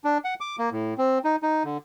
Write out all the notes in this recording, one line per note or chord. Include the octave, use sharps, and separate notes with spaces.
D4
F#5
D6
A#3
A2
C4
D#4
D#4
D3